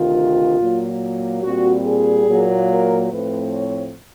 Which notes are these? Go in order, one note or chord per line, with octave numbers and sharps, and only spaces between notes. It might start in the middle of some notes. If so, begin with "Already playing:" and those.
Already playing: D2 C3 D#3 F4
A#2 F#3 A#3
A#2 G3 C4 F#4
G#4
A#2 F#3 A#3
A#4
A2 F3 A3 C4 B4
C#5